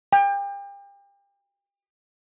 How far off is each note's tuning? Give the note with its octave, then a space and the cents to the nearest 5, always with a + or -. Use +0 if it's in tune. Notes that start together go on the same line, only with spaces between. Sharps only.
G5 +35